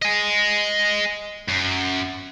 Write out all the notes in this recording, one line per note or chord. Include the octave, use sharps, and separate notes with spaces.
D#5 G#5
F#2